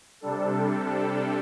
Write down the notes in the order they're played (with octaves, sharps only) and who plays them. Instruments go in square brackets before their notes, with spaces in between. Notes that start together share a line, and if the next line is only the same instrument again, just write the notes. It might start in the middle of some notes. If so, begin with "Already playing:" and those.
[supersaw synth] C3 G3 D4 A4